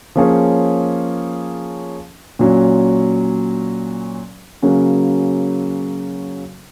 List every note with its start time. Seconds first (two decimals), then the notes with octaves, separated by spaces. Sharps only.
0.16 F3 A#3 C#4 G#4 C#5
2.39 A#2 F#3 C#4
4.62 C#3 F#3 A#3 C#4 F#4